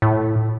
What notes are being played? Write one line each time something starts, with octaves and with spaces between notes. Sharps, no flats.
A2